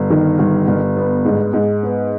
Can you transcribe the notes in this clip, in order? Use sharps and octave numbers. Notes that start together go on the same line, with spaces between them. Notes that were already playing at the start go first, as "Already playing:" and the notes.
Already playing: G1
D#3
G1
G1
B3
G#2
G#2
B3